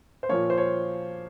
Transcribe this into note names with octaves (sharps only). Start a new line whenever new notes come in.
C5
A#2 F3 A#3 C#5
C5
C#5